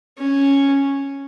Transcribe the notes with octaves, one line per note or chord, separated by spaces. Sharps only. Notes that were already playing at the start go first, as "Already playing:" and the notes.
C#4